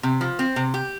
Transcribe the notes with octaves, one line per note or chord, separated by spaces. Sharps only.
C3
F3
C4
C3
G4